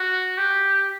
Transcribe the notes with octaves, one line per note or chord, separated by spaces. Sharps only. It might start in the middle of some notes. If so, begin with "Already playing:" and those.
Already playing: F#4
G4